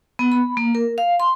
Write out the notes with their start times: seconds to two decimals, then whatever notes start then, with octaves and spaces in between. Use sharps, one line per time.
0.19 B3
0.32 B5
0.57 A#3
0.75 A#4
0.98 F5
1.20 C6